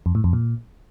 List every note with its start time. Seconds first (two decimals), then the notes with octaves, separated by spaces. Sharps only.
0.06 F2
0.15 A2
0.24 F2
0.33 A#2